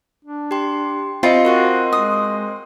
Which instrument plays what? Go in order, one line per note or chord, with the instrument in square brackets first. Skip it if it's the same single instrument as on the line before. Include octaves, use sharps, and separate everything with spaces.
[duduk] D4
[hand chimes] G4 G5 C6
[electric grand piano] C4 D#5 [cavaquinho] F4 [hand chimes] C5 B5 C#7
[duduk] F#4 [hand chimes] A#4 C6 F#6
[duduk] G#3 [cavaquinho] D#6